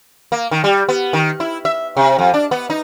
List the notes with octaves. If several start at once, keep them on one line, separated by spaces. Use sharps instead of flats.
A#3
D#3
G3
B3
D#3
E4
E5
C3
F2
D4
B3
D#4